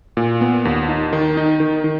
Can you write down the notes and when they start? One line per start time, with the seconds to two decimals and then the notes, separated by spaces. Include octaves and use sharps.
0.17 A#2
0.41 B3
0.65 D#2
0.89 D#4
1.13 D#3
1.37 D#4
1.60 D#3
1.84 D#3